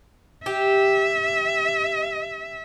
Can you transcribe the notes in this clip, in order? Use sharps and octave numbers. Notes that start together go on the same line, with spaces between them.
G4 E5